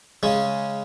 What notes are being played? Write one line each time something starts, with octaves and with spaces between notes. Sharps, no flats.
C#3 G#3 C#4